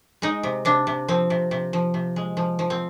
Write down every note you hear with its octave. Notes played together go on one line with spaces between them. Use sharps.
G#3 D#4
C3
C3 D4
C3
F3 C4
C3
C3
F3
C3
G#3
F3
F3
C4